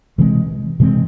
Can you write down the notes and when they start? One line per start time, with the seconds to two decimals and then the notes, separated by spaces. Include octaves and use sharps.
0.18 C3 E3 G#3 C4
0.80 C3 E3 G#3 C4